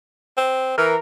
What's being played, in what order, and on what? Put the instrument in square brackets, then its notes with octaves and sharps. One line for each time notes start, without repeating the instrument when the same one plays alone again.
[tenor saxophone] C4
[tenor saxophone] E3 [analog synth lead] A#4